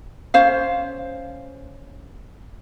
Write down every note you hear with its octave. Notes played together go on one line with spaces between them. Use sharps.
C#4 C5 F5